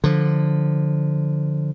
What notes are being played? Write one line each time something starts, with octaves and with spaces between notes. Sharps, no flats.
D3 F3